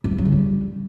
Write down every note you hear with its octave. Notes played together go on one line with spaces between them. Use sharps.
G3
F3
F#3
C#3
G3